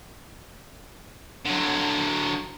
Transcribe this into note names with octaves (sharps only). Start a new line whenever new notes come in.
D3 F#3